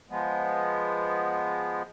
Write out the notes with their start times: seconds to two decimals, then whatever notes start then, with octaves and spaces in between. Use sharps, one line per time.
0.10 F3 G#3 B3